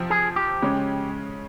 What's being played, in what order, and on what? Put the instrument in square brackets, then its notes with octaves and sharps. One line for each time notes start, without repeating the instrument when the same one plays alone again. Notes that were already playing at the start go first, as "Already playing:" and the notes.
Already playing: [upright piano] C3 F3 C4 F4
[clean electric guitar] G#4
G4
[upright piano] C#3 G#3 C#4